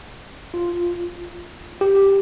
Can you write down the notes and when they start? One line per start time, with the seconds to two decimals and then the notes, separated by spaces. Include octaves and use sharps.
0.54 F4
1.81 G4